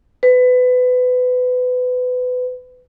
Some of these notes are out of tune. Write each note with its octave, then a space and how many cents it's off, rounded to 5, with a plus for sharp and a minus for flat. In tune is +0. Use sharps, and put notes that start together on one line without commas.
B4 +25